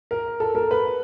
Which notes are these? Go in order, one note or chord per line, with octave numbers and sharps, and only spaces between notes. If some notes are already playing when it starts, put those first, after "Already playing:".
A#4
A4
A#4
B4